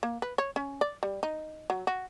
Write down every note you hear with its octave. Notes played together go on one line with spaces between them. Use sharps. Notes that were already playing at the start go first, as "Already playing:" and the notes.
A#3
B4
C#5
C#4
D5
G3
D#4
F#3
F#4